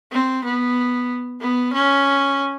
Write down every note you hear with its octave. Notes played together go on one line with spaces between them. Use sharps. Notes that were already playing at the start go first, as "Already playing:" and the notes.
C4
B3
B3
C#4